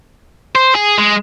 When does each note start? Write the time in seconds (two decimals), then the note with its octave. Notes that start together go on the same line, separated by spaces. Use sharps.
0.56 C5
0.75 G#4
0.98 G#3